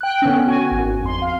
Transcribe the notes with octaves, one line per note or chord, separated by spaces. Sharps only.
G5 F#6
D3 B3 C#4
F#4 G#5
G#1
F2 C6
F5